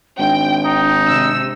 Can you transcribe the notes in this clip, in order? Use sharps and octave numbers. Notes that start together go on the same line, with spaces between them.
G#1 D4 G5
D#4
C3 E6